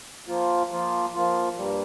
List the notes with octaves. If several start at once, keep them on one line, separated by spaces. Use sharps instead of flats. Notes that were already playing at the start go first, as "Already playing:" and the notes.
F3 A#3 F4
F3 A#3 F4
F3 A#3 F4
G2 G3 A#3